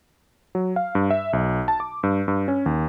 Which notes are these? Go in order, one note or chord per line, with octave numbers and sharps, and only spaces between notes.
F#3
F5
G2
E5
B1
A5
D6
G2
G2
C#4
D#2